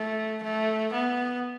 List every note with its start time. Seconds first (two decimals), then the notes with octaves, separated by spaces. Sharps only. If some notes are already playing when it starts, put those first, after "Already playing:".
Already playing: A3
0.43 A3
0.92 B3